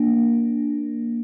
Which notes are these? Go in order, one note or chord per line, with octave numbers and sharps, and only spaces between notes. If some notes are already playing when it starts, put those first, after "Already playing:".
Already playing: A#3 D4